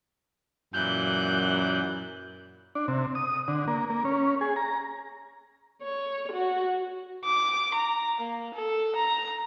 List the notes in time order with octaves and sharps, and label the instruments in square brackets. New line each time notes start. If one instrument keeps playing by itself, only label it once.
[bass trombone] F#2 [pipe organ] A#2 E3 [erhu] F#6 [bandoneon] G6
[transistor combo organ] D4
C3
D#6
D3
A#3
A#3
C#4
G#4
A#5
[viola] C#5
F#4
[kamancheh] D6
A#5
A#3
A4
A#5